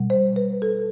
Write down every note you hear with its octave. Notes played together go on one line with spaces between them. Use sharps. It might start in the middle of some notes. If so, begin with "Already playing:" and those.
Already playing: B2 G3
C5
B4
A4